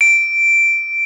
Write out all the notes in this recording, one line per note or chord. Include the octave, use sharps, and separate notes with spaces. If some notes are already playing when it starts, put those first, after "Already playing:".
D7